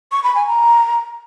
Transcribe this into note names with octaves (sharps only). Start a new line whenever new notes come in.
C#6
B5
G#5
A#5